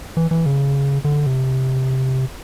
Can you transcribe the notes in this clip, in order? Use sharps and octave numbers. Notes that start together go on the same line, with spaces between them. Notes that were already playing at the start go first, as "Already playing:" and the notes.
E3
E3
C#3
D3
C3